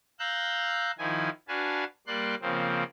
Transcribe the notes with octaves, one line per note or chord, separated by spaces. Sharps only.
F5 A#5 E6 F#6 G6
D#3 F3 E4 G#5
D4 F#4 B4 F5 G#5 A5
G3 A#3 D5 C6 F#6
C#3 F3 A#3 C4